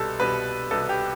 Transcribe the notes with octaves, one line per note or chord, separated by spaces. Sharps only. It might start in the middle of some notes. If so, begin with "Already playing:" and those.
Already playing: C2 B2 G3 A4
C2 B2 G3 B4
C2 B2 G3 A4
G4